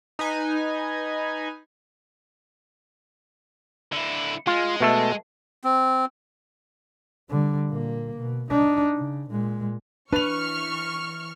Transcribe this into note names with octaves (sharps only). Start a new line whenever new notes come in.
D#4 B4 G#5
D3 E4
G#3 F4
B2 A3 A4
C4
D3 G3
A#2 A#3
B2
D4 D#4
C#3
A#2 G#3
E3 D4 B4 C#6 F6 F7